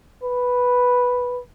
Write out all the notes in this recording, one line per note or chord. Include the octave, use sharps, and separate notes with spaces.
B4